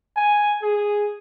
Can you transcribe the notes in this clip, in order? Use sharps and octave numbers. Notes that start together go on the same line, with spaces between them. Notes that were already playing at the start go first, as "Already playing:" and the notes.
G#5
G#4